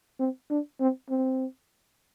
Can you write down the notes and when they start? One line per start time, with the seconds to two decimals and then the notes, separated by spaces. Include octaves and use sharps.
0.20 C4
0.50 D4
0.80 C4
1.10 C4